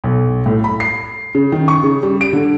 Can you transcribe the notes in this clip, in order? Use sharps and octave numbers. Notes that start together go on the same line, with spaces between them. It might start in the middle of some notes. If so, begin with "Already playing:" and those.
B1
A2
B5
C7
C#3
D#3
C#6
C#3
G3
D7
D3